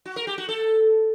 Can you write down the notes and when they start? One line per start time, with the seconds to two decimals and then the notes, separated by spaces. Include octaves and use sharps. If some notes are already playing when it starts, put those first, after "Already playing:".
0.05 F#4
0.16 A#4
0.27 G4
0.38 F#4
0.49 A4